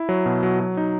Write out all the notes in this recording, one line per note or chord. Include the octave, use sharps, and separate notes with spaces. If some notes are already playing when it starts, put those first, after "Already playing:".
Already playing: E4
F#3
B2
F#3
F#3
D#4